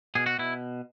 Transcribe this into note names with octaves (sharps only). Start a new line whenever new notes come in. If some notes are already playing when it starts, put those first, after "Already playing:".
B2 G#4
F#4
B2 E4